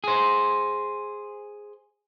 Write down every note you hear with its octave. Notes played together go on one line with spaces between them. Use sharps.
G#4 C5